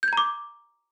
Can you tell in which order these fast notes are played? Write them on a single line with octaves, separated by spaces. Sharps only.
G6 G#6 A#5 D6